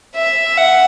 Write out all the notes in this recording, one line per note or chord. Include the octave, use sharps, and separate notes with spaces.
E5
F#5